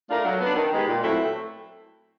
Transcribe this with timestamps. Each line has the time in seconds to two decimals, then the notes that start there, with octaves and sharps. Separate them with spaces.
0.09 A3 D4 F4 A#4
0.25 F#3
0.40 B3 D4
0.56 D#3
0.72 G#3 B3 D#4 G4
0.87 A#2
1.03 F#3 A3 C4 E4